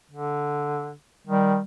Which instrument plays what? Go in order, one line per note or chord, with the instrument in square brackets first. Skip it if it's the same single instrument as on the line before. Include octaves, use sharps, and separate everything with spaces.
[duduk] D3
[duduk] D#3 [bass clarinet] G3